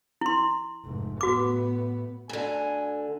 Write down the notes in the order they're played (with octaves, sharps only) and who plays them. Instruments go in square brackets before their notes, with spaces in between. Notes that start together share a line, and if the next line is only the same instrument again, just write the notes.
[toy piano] E4 C6
[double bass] F1 G#2
[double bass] A2 B3 [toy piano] F#4 D6
[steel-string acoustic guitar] D2 D3 [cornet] G#5